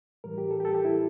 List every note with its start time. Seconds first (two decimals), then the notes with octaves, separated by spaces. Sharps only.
0.24 A2 E3 G3 A#4
0.38 G4
0.51 A4
0.60 G4
0.65 A4
0.74 G4
0.85 E4